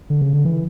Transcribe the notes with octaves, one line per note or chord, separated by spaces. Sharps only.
D3
C#3
D3
E3